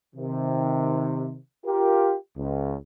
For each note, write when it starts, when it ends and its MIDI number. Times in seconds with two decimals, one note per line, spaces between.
0.15 1.37 48
0.15 1.37 51
1.66 2.13 65
1.66 2.13 67
1.66 2.13 70
2.37 2.73 37